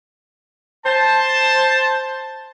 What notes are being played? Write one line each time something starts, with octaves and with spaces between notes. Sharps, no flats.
C5 A5